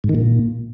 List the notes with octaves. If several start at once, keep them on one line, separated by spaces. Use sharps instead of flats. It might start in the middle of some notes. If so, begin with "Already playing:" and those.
G#2
D#3
A#2